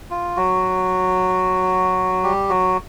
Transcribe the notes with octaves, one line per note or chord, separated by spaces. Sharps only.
F4
F#3 F#4
G3 G4
F#3 F#4